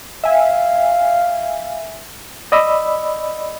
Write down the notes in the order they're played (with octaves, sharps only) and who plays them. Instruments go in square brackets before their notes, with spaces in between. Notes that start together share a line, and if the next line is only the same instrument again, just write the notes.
[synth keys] E5 G#5 [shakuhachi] F5
[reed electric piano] D5 D#5 B5 E6